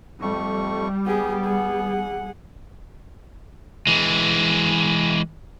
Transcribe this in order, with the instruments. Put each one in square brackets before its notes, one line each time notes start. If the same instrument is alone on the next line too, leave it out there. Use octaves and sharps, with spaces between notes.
[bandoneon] F2 A3 C#6 [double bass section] G3
[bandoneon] B3 [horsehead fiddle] G4 G#4
[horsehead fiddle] G#4 F#5
[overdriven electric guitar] E3 G#3